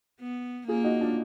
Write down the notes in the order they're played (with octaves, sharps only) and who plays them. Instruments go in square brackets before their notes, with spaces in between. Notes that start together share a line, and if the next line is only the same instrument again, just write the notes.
[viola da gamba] B3
[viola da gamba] A#3 [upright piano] F4 G#4
[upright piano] D#4 F#4
D4 F4